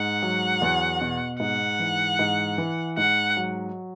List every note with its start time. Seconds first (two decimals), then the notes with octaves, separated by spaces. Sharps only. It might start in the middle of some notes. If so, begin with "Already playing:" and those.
Already playing: G#2 F#5
0.23 F#3
0.62 E2
1.01 B2
1.40 G#2 F#5
1.79 E3
2.19 G#2
2.58 E3
2.97 G#2 F#5
3.37 F#3